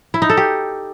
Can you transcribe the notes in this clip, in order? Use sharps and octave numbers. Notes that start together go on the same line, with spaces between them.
E4
D#4
A4
G4